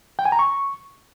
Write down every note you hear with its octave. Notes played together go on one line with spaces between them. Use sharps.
G5
G#5
A#5
C#6